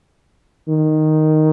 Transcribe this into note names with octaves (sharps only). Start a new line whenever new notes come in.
D#3